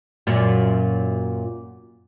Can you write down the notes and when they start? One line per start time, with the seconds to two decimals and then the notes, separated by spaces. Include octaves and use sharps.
0.27 F#2 A#2